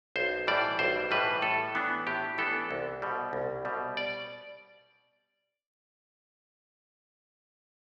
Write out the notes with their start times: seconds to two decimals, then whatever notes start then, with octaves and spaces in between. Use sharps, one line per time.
0.16 B1 C5
0.47 A2 E3 G3 D5
0.79 B1 C5
1.11 A2 E3 G3 B4
1.42 A2 A4
1.75 E3 B3 D4
2.07 A2 G4
2.38 E3 B3 D4 A4
2.71 C2
3.02 B2 G3
3.33 C2
3.65 B2 G3
3.97 D5